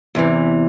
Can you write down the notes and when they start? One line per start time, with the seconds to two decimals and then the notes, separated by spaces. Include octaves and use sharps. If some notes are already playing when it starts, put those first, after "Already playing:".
0.15 E2 C3 E3